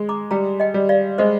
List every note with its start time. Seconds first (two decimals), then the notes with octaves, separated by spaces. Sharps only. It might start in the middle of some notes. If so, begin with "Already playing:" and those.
Already playing: G#3
0.09 A#5 D6
0.31 G3 G5 A#5
0.60 D#5 G5
0.74 G3
0.89 D5 F5
1.18 G#3 C5 D#5